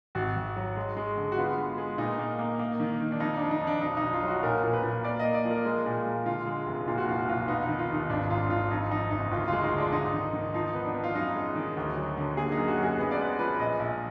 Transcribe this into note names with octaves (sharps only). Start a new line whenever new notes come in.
G#1 F#4
G#1
F#3
G#3
G#3
D3
F#4
B3 F4
G#3
G#3
A#2 D#4
A#3
A#3
A#3
D#3
D#3
D4
F2 D#4
F2 D4
D#4
F2
D4
B1 D#4
D#4
B1
F4
F#3
F#4
A#2 A#4
A#2
B4
A#2
A#3 D5
D#5
A#3
D5
F3
A#4
G#3
A#2
G#3
D3 F4
G#3
F1
A#2 F4
F#4
F3 F4
F#4
B1 F4
B3 D#4
D#4
D#3
F4
D#2 D#4
G#1 D4
G#2 F4
G#1 F4
F2 D#4
F2 D#4
F#1 D#4
D2 F4
G#3 F4
D#4
D3
D4
D4
G#2 D#4
D#3
D#3
F3 D#4
B3
D4
B3
F4
F#2 D#4
G#3
D#3
D2
F#3
D3
A#3 G#4
D#4
F#2
F#4
F#2
G#4
B3
D5
G#3 B4
F3 B4
A#1 D#5
A#1